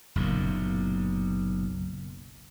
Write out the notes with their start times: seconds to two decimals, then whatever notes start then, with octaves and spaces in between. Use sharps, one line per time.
0.15 F#1 B1 F#2 A#2